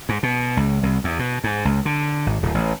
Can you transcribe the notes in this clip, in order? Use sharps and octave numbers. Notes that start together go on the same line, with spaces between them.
G#2
B2
C#2
C2
E2
B2
G#2
C#2
D3
G#1
D1
A1